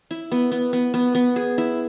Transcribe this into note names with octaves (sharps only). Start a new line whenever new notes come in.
E4
B3
B3
B3
B3
B3
G#4
E4